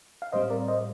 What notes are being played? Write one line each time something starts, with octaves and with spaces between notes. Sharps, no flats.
F5
A2 G3 C4 C5 D#5
A#4 D5
C5 D#5